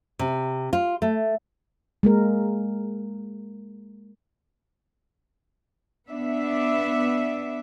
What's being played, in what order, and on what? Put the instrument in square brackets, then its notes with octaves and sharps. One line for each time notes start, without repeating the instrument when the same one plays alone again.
[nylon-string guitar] C3
F4
A3
[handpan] G#3 A#3 A#4
[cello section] B3 D4 E5